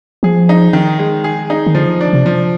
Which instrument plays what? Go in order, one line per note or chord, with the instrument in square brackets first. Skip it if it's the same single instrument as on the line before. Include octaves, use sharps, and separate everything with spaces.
[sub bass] F3 [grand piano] G#4
[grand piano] D#4
D#3
G#3
G#4
D#4
[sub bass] D#3
[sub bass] D3 [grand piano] F3
[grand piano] D4
[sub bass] C3
[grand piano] F3